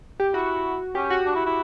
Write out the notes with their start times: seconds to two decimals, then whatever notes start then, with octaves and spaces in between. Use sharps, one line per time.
0.20 G4
0.34 E4 F#4
0.95 C#4 G4
1.10 F#4
1.26 D4
1.35 E4
1.46 E4